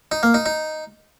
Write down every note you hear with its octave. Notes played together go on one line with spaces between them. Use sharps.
D#4
A#3
D#4
D#4